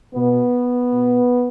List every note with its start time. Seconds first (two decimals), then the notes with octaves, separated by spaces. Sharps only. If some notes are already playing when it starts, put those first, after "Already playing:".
0.15 B2 B3
0.92 B2